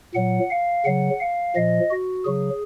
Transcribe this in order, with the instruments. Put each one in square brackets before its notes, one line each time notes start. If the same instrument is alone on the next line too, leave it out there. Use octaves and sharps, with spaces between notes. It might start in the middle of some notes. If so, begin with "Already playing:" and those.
[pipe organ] A#2 F#3 F#5
F5
C#3 F#3 F#5
F5
A#2 F3 D#5
F#4
C#3 F#3 G#4